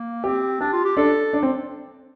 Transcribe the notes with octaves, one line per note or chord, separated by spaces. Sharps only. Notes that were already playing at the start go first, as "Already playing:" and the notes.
Already playing: A#3
C4 G4
D4 G4
F4
G4
D4 A4
D4
C4